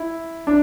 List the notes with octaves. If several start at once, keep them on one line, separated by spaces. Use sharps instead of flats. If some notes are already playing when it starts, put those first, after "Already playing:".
Already playing: E4
D4